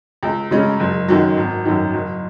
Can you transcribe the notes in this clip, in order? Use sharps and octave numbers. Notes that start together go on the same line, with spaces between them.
C#2
C#3 G#3 C#4
F#1
F#2 D#3 F#3
G#1
F#2 D#3
F#1